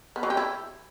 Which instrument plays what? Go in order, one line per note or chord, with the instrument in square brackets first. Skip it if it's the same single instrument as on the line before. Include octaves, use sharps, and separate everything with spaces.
[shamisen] B3
F#3
G4
E4